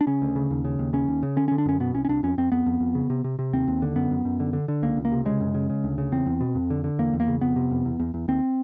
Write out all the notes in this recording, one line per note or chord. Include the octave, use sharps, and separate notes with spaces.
D4
C#3 C#4
D2
C#3
D#2
C#3
D#2
C#3 C#4
D#2
C#3
D3 C#4
C#4
D3
D4
F#2 C#4
B2 B3
C2 C#4
C#4
C2 D4
F2 C#4
F2 C4
F2 B3
F2
F2
C#3
C3
C3
C3
D#2 C4
D#2
D3
F#2 B3
F#2
F#2
D3
D3
D3
C#2 A#3
C#2
A#3
C3
C#3 G#3
F#2
C#3
C#3
D2
C#3
E2 C4
E2
B2
F2
D3
D3
E2 A#3
E2
A#3
C#3
F2 B3
C3
F2
E2
E2
E2
D#2 C4